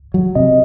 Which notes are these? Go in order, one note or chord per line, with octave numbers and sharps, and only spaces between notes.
F#3
C3 D#5